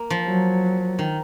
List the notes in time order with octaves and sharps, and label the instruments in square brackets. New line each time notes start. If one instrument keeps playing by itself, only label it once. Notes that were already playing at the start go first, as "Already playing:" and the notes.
Already playing: [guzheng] A#3
F3
[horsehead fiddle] F#3
[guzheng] D#3